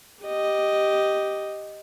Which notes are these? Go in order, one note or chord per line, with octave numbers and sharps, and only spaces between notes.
G4 D#5